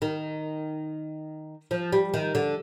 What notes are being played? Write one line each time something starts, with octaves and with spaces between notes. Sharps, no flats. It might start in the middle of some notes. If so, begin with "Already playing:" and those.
D#3
F3
G3
D#3
D3